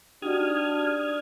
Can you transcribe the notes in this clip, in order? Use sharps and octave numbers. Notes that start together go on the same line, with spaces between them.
D4 D#4 F#4 G4 D#6 F6 G#6